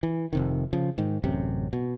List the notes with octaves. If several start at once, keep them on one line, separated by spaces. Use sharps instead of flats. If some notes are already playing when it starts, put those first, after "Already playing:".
E3
F1 C3 D#3
C#3 F3
G#2 D#3
A1 F#2 C3
B2